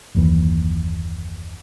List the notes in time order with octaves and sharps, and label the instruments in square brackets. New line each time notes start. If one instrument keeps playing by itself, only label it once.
[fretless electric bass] F#1 D#2 E3